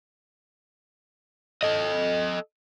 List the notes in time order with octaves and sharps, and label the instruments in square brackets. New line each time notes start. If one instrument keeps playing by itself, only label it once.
[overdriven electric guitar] A4 D#5